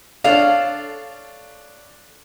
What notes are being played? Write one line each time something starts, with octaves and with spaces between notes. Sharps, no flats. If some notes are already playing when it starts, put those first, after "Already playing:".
D4 A4 C#5 F5